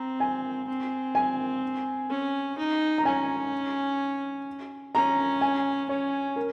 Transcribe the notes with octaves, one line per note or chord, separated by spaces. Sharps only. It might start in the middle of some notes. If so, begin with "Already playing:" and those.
Already playing: C4 A#5
G#5
C4
G#5
C#4
D#4
A#5
C#4 G#5
C#4 A#5
G#5
C#4 C#5
A#4